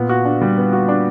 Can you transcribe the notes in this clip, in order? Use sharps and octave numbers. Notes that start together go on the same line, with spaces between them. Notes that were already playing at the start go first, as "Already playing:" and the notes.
Already playing: A#2 B3
F#4
D4
G3
B3
F#4
D4